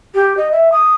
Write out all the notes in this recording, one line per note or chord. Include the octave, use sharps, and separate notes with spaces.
G4
D#5
E5
D#6